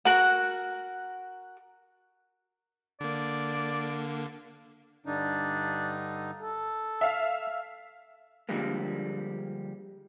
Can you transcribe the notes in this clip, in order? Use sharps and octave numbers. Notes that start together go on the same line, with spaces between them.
F#4 A#4 F#5
D3 A#3 D5
G2 D3 D4 D#4
A4
E5 F5 E6 F6
D3 F3 G3 G#3 A#3